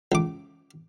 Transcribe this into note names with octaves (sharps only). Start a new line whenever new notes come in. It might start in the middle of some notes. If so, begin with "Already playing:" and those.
C#2 D6